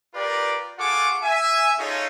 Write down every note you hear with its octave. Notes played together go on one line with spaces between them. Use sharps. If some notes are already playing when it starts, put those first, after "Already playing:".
F4 G4 A#4 B4 D5
F4 G#4 A4 F#5 C#6 D6
E5 G#5
C#4 D#4 F4 G#4 A4 C#5